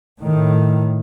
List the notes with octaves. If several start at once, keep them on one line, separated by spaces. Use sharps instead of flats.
A2 D#3